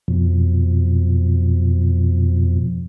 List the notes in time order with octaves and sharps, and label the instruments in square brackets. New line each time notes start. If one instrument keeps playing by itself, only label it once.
[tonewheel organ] F2 B2 F3